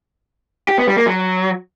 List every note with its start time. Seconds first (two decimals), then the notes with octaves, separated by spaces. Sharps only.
0.69 G4
0.78 B3
0.87 G3
0.97 A#3
1.06 F#3